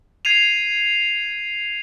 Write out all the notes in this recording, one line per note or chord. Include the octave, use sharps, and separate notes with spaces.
G#6 C7 D#7 F7